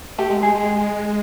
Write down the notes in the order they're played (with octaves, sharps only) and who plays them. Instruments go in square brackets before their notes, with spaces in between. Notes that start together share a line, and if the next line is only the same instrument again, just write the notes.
[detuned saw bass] A3 [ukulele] G4
[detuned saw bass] G#3
[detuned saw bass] G#3 [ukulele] G#4
[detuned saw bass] G#3